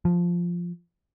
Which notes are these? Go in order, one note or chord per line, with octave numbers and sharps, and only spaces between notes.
F3